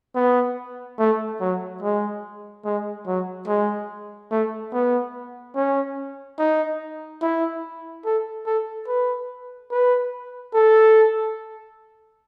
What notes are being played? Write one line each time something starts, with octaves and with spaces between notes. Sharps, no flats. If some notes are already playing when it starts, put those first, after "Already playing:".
B3
A3
F#3
G#3
G#3
F#3
G#3
A3
B3
C#4
D#4
E4
A4
A4
B4
B4
A4